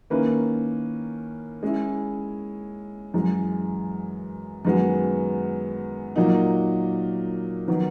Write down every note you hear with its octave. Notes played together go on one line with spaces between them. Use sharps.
D#3 A#3 C#4 E4 B4
G#3 C#4 E4
F#2 E3 G#3
F#2 D#3 G#3 B3 F#4
A#2 F#3 A#3 D#4
D#3 F#3 B3